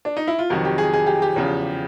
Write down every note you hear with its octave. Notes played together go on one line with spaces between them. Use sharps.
D4
D#4
E4
F4
F2 C3 D#3 F#3 F#4
G4
G#4
G#4
G4
G4
E2 C#3 F3